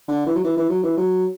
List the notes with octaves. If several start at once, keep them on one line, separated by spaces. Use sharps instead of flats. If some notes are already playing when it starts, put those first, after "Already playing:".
D3
E3
F#3
E3
E3
F#3
E3
F#3